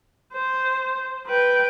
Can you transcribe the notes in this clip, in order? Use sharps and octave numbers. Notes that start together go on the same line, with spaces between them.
C5
B4 G5